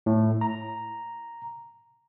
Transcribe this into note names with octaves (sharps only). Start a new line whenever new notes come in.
A2
A#5